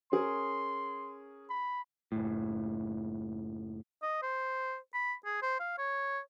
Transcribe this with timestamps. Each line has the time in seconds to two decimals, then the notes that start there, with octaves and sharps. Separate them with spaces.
0.12 C#4 G#4 A#4 C6
1.50 B5
2.12 F#1 A2
4.02 D#5
4.23 C5
4.94 B5
5.25 G#4
5.42 C5
5.60 F5
5.78 C#5